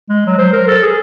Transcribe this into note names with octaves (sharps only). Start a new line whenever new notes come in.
G#3
F#3
C5
A#4
A4
G#4